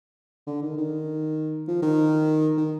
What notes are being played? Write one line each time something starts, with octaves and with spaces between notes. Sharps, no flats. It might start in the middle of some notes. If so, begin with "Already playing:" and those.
D3
D#3
D#3
F3
D#3
D#3